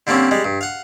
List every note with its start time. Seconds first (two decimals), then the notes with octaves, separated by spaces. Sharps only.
0.07 D3 G3 A#3 C4 C#4
0.31 G3 G#3
0.44 G2
0.61 F5 F#5